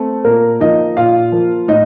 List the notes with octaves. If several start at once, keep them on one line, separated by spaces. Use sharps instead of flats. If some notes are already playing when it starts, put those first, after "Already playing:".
Already playing: A3 C4 A4
A#2 A#3 A#4
F3 A#3 D#4 D#5
A#2 F4 F5
F3 A#3
A2 D#4 D#5